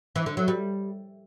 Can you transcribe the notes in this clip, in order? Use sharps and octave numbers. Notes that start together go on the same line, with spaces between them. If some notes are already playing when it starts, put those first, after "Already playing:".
E3
D3
F#3
G3